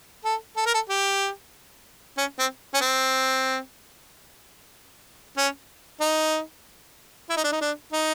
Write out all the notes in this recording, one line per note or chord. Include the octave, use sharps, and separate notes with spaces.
A4
A4
A#4
A4
G4
C#4
C4
C#4
C4
C#4
D#4
E4
D#4
D4
D#4
D4
D#4